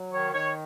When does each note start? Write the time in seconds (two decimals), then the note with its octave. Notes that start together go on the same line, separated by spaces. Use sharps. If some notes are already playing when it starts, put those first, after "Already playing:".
Already playing: F#3
0.12 D#3 C#5
0.33 D#3 C#5